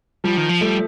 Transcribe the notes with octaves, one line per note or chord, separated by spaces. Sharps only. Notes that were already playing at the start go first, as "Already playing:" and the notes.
F3 G3
D#3
F3
G3 A3